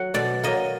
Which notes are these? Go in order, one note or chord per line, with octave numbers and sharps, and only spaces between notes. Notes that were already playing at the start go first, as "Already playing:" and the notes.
Already playing: F#3 F#5
B2 D5
F#3 A#3 D#5